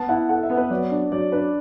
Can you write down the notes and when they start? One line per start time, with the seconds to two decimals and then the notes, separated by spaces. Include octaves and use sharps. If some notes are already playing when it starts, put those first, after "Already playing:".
Already playing: B3 A5
0.09 E4 F#5
0.29 A4 F#5
0.43 E5
0.50 B3
0.57 B4
0.70 F#3 D5
0.91 D4
1.12 F#3 D5
1.32 D4 B4